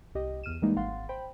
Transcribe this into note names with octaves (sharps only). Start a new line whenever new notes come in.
C2 G4 D#5
E2 F6 D#7 E7
E3 G3 G#3 A#3 D#4
G#1 F5 F#5 C6 A6
C5 G5 B5